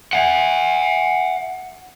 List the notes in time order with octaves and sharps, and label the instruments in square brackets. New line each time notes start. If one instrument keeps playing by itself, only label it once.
[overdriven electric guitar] E5 F#5